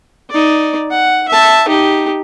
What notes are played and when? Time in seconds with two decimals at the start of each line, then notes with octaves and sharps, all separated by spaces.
0.30 D#4 D5
0.91 F#5
1.28 E5 A5
1.68 D#4 G4